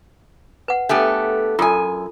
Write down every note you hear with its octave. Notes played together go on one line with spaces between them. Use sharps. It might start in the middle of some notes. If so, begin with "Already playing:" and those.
B4 F#5
A3 B3 D4 G4
F#2 F4 A4 G#5